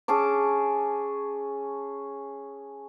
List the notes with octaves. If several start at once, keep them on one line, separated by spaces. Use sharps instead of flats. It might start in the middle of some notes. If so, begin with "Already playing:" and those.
C#4 G#4 A5 D6